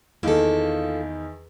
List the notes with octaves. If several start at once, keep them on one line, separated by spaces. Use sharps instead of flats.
E2 D#3 A#3 F4 A4